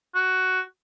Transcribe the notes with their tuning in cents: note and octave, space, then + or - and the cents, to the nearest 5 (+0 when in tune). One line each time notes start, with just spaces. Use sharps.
F#4 +10